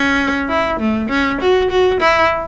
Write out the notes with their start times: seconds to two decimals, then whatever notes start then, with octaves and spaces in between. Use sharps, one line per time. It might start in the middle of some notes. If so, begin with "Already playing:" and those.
Already playing: C#4
0.49 E4
0.80 A3
1.10 C#4
1.41 F#4
1.70 F#4
2.01 E4